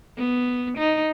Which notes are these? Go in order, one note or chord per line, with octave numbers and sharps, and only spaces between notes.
B3
D#4